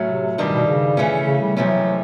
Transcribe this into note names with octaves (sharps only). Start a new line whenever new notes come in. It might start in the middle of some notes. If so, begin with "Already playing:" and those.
Already playing: A2 F#3 A3 C#4
C3
G2 B2 D#3 G3
B2
C#3
E3 A3 C#4
C#3
G3
F2 C3 E3 F#3 A3 C#4